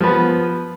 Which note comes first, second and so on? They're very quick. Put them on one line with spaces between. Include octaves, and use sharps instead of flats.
F3 B4 B3